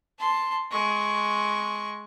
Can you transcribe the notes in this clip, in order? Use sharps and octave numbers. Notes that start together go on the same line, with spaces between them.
A5 C6
G#3 C#6